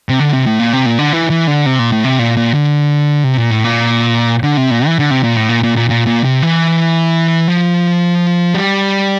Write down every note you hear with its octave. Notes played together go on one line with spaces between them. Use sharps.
C3
D3
C3
A2
A#2
C3
A#2
D3
E3
E3
D3
C3
A#2
A2
C3
A#2
A#2
D3
C3
A#2
A2
A#2
D3
C3
A#2
E3
D3
C3
A#2
A2
A#2
A#2
A#2
A#2
A#2
C3
E3
F3
G3